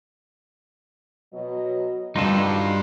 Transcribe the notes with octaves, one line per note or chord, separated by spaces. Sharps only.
B2 F#3 D#5
G2 D#3 D4 D#4 F4 F#4 A4